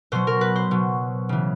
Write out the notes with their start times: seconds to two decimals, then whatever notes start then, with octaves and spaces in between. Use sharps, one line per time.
0.12 B2 F#3 C5
0.27 A#4
0.41 B4
0.56 C5
0.71 B2 F#3
1.29 C#3 E3